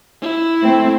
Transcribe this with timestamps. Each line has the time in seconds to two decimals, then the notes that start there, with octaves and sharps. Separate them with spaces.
0.21 E4
0.61 A3 C4